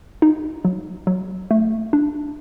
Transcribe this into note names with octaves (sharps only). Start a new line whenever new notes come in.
D#4
F#3
F#3
A3
D4